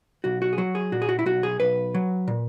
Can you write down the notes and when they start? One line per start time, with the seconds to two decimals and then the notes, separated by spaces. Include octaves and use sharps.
0.24 B1 F#4
0.42 F#4
0.53 G#4
0.58 F#3 F#4
0.75 G#4
0.92 A#2 F#4
1.02 G#4
1.09 F#4
1.19 E4
1.26 B1 F#4
1.43 G#4
1.60 B1 B4
1.94 F#3
2.28 A#2